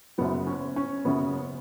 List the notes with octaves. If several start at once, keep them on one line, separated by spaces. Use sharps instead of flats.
F#1 F#2 C#3 F#3 B3
C#4
C#4
F#1 F#2 C#3 F#3 B3